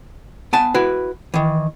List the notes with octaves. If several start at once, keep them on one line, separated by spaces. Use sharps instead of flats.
B3 G#5 A5
E4 F#4 B4
D#3 E3